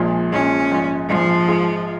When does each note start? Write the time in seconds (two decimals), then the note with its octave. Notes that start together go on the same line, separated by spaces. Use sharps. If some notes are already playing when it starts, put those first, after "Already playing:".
Already playing: A#1 A#2 F3 G#3
0.32 A#1 A#2 F3 G#3 C#4
0.71 A#1 G#2 G#3 F4
1.09 A#1 G#2 F3 G#3 F4
1.48 G#2 G#3 F4 G#4